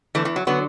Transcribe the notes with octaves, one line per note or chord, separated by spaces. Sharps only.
E2 D3 E3 A3
E3
F#3
D3 F#3 B3